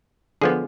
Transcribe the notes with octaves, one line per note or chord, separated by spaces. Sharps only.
D3 F3 B3 G#4